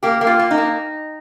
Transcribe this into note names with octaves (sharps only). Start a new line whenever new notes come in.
A#3 G4
A#3
F4
A#3
D#4
A#3